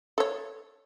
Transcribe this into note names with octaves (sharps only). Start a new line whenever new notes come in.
A4 C#5